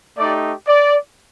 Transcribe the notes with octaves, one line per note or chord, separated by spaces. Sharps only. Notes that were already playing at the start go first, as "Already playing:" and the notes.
A3 D#4 G4 D5
D5